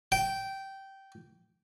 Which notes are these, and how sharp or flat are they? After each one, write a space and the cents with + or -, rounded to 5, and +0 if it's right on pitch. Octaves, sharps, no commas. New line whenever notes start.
G5 -15